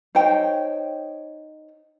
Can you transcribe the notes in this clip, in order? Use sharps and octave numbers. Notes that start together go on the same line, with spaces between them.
D#4 C5 C#5 G5